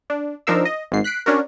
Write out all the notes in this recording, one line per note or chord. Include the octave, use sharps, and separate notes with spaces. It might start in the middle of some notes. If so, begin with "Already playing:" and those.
D4
F3 D4 D#4 A#4 F5 E6
D#5
G#1 G#2 C7
F#6 B6 C7 D7
C#4 D4 F#4 A#4